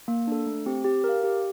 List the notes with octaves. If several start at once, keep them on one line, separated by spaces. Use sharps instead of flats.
A#3
D4 A4
A3
C4 G4
G4
A#4
F5
G4